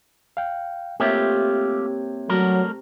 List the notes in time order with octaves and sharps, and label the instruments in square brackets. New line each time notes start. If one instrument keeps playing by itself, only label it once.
[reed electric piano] F5 G5
[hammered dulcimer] C3 [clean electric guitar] A3 F4 G4 [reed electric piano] A#3 C#5 G#6
[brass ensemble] F#3 [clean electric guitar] G3 A3 A#4